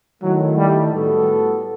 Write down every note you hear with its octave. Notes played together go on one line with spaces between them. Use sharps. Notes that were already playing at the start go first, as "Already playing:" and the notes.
D#3 F#3 A3 E4
G3
A2 G3 B3 F#4 A4